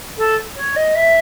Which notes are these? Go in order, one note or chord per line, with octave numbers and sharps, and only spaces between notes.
A4
C#5
D#5
E5